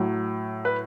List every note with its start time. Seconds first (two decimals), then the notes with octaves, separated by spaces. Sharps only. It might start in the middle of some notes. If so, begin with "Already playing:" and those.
Already playing: A2 F#3
0.65 B4